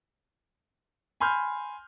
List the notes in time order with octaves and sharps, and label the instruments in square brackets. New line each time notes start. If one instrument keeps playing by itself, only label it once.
[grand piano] G#5 B5 C6 F6 G6